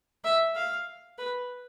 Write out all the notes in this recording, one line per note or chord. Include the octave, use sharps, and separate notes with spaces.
E5
F5
B4